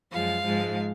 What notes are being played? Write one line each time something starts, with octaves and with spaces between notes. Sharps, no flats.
F#2 F3 G#3 F5
G#2 F3 G#3